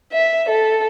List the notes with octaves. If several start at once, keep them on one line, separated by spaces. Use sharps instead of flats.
E5
A4